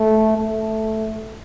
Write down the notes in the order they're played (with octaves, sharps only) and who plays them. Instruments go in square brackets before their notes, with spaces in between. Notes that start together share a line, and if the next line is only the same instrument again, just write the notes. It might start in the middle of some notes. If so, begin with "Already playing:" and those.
Already playing: [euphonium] A3
A3